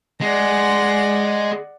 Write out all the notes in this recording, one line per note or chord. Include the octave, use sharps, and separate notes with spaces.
G#3 D5 F#5 A#6